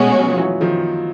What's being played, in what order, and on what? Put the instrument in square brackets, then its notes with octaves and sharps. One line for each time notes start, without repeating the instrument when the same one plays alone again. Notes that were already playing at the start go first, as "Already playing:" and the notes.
Already playing: [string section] B2 G#3 C#4 F#4 [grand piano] A3 B3
[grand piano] F#3
F3
E3 F#3
D#3 F3